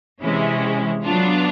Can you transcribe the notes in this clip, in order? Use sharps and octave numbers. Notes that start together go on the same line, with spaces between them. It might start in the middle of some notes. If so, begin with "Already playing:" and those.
C3 E3 G#3 C#4 E4
F#3 B3 D4 F4